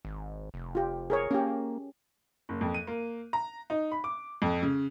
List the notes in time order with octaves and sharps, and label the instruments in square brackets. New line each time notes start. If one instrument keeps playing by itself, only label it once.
[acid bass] G#1
F1
[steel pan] F4 G4
G#4 A#4 C#5
[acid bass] A#3 [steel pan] C#4 G4
[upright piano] F#1
F2
D#7
A#3
A#5
D#4
B5
D6
F2
C#3